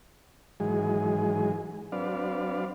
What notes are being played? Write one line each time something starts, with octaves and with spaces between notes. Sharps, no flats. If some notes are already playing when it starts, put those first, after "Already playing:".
G#2 D#3 E3 F#3 G#3 G#4
F#3 C4 D4 B4 D5 F5